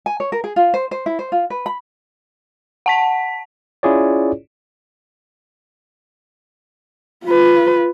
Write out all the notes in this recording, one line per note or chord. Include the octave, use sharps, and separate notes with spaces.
G#5
C#5
A#4
G#4
F4
C5
C5
E4
C5
F4
B4
B5
F#5 A5 B6
C#4 E4 F4 G#4 C#5 D5
F4 B4